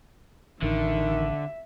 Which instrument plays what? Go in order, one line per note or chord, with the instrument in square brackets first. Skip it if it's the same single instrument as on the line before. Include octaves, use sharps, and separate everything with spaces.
[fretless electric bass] A1 [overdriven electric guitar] D3 [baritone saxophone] D#3 [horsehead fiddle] E5